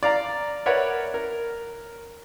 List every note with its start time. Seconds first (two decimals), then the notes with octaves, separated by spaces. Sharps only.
0.03 D5 F5 A#5
0.66 A#4 B4 C#5 D5 E5 F#5
1.14 A#4